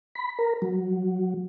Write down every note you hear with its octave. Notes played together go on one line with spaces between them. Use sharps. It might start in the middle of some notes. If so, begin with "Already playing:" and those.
B5
A#4
F#3